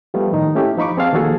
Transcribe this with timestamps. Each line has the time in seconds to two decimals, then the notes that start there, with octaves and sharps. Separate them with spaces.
0.14 F3 G3 A3 B3
0.32 A2 D#3 D#4
0.55 A3 C#4 E4 G4
0.78 F3 D#4 B5 C#6 D6
0.97 C4 G#4 D5 F5 A5
1.13 D#3 F3 A#3 F#4 G#4 A4